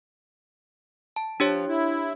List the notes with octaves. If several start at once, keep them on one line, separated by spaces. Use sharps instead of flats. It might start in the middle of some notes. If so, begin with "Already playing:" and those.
A5
F3 D4 G4 C#5
E4